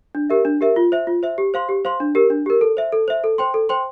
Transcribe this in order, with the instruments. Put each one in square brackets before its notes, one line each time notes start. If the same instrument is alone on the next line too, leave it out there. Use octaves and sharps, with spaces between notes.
[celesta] D4
G4 A#4 E5
D4
G4 A#4 E5
F4
C5 E5
F4
C5 E5
G4
C5 F5 C6
G4
C5 F5 C6
D4
G4 A#4
D4
G4 A#4
A4
C5 E5
A4
C5 E5
A4
C5 G5 C6
A4
C5 G5 C6